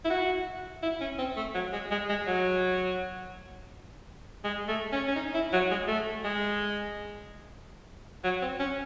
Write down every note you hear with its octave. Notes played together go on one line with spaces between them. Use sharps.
E4
F#4
E4
C#4
C4
A3
F#3
G#3
G#3
G#3
F#3
G#3
A3
C#4
C#4
D#4
E4
F#3
G#3
A3
G#3
F#3
C4
C#4